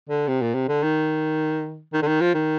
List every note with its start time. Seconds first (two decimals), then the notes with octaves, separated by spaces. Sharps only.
0.09 D3
0.28 C3
0.42 A#2
0.55 C3
0.69 D3
0.83 D#3
1.93 D#3
2.02 D3
2.08 D#3
2.21 F3
2.34 D#3